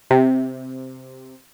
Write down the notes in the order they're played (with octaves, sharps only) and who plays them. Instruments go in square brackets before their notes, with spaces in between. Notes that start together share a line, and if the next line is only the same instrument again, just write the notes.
[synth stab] C3